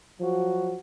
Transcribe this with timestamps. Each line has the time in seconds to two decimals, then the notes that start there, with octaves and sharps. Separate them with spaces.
0.20 F3 F#3 F#4